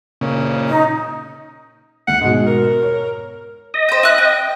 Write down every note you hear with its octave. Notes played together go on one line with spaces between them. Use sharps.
A#2 C#3
D#4
D2 F#5
G#2 B2 G#3
A#4
C#5
D#5
C5 G5
E4 F#6
G5